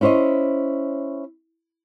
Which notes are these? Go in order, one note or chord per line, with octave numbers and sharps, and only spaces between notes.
C#4 E4 C5 C#5 D#5